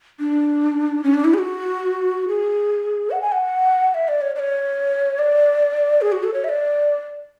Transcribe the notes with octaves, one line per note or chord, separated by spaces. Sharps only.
D4
C#4
D4
E4
G#4
F#4
G#4
F#5
G#5
F#5
E5
D5
C#5
D5
C#5
D5
G#4
F#4
A4
C#5
E5
D5